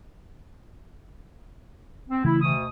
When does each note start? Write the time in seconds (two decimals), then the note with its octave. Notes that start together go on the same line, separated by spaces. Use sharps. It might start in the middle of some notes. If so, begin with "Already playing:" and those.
2.09 C4
2.24 C#3 E3 A3 E4
2.41 D2 B2 D#6